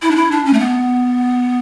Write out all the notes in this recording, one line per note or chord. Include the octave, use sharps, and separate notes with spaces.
E4
D4
E4
D4
C#4
A3
B3